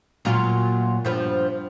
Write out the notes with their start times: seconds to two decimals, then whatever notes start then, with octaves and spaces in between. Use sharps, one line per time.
0.25 A#2 F#3 F4
1.05 G2 F3 B3